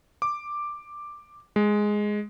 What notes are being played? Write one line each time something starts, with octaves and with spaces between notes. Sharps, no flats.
D6
G#3